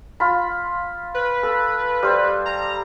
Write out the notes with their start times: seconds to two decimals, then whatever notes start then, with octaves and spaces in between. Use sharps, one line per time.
0.20 F4 B5
1.14 B4
1.43 A4
2.03 G3 C5
2.46 A#5